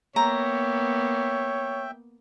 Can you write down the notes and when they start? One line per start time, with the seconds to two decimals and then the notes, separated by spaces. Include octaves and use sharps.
0.16 A#3 B3 C#5 E5 G5 A#5